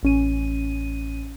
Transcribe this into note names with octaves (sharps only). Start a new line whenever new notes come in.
A1 C#4 D#7